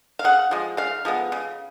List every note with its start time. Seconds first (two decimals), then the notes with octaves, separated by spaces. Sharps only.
0.19 F5
0.24 C#3 F#5
0.51 F3 G#3
0.77 C#3 F5
1.05 F3 G#3 B3
1.32 C#3